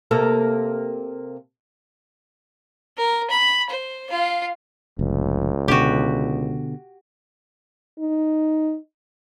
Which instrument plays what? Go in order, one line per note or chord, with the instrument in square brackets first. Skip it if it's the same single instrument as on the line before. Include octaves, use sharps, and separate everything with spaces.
[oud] C3 A#3 A4
[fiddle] A#4
B5
C5
F4 F5
[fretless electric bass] F1 [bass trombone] C#2
[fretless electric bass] B2 D3 [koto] F#4 G4
[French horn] D#4